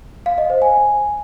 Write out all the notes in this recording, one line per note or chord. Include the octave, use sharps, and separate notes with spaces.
F5
D#5
C5
G#5